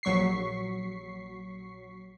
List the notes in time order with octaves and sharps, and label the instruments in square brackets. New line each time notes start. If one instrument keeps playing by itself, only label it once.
[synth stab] A#1 F#3 C#6 B6 C7